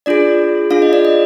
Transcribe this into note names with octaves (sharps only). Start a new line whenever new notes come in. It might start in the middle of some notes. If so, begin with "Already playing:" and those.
D4 F4 G#4 D5
D4 F4 G#4 F5
D#5
D5
D#5